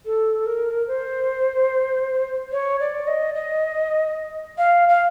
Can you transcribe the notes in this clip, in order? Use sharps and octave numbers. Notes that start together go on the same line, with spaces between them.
A4
A#4
C5
C#5
D5
D#5
D#5
F5
F5